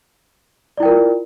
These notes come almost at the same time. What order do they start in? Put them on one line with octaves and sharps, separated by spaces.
D5 E4 G5 A#4 F4